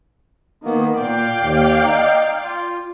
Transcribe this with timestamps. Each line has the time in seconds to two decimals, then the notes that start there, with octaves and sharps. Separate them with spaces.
0.65 D#3 A#3 B3
1.00 A#2 D5 F5 G5
1.41 D#2
1.84 D#4
2.42 F4